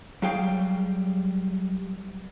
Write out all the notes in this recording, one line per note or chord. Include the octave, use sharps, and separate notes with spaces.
F#3 G3 G#4 F5 G5